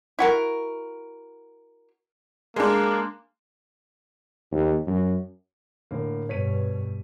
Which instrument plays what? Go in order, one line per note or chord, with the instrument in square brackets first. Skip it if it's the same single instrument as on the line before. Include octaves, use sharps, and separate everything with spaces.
[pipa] E4 F#4 A#4
[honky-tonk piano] G#3 D4 [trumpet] A#3
[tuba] D#2
F#2
[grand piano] A2 D3 A#3
[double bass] G2 B2 [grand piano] C#5 B6 D#7